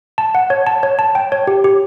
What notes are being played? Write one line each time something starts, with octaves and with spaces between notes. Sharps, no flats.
A5
F#5
C#5
A5
C#5
A5
G5
C#5
G4
G4